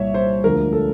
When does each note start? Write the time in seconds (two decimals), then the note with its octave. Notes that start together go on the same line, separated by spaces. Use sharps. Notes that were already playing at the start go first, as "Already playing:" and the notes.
Already playing: C2 A#2 G3 C#5 E5
0.14 C5
0.44 D2 D3 F3 G#3 A#4
0.73 A4